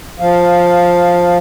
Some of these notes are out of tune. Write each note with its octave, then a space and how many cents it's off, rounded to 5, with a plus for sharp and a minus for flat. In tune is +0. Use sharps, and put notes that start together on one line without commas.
F3 +10 F5 +0